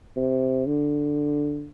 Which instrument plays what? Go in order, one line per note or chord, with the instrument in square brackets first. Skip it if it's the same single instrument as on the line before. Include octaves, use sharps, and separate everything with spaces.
[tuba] C3
D3